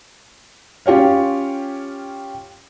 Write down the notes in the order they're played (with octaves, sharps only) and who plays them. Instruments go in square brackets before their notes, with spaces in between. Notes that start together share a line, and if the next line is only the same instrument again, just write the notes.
[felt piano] C#4 F4 G4 C#5 F5